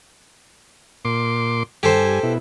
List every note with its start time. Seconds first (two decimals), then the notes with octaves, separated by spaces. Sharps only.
1.05 A#2 C6 D6
1.83 G2 G4 A4 C5 G#5
2.23 B2 E4